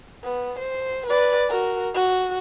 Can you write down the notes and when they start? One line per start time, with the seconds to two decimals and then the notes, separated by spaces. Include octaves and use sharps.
0.24 B3
0.59 C5
1.06 B4 D5
1.49 F#4 A#4
1.94 F#4